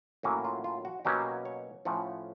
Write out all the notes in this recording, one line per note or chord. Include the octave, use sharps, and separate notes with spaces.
A2 F#3 A#3 C#4 F#4
F4
F4
F#4
B2 F#3 A#3 C#4 G4
C#5
A2 F3 A3 C#4 F#5